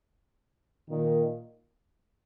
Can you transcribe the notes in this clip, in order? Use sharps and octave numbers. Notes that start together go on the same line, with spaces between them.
A#2 D#3